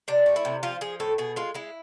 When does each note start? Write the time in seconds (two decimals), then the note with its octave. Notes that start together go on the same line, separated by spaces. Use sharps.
0.08 C3 D4
0.26 A3
0.36 E4
0.45 C3
0.63 F3 F4
0.81 F3 G#4
1.00 A2 A4
1.18 B2 G#4
1.36 G#3 F4
1.54 G#3 E4